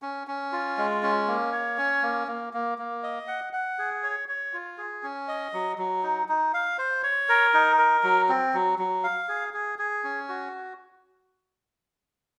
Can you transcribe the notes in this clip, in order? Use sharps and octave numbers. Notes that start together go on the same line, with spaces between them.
C#4
C#4
F4
G#3
C#4
A#3
C#5
C#4
A#3
A#3
A#3
A#3
D#5
F#5
F#5
G#4
C#5
C#5
F4
G#4
C#4
D#5
F#3
F#3
D#4
D#4
F5
C5
C#5
A#4
D#4
A#4
F#3
C4
F#3
F#3
F5
G#4
G#4
G#4
C#4
F#4